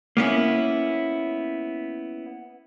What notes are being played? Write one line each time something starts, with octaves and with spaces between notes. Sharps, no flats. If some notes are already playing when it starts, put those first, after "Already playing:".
A#3 B3 C#4 E4